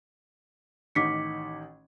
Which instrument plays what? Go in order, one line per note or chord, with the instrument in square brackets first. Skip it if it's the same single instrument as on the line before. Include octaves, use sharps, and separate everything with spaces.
[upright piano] A1 D#3 D#4 [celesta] D6 B6 C#7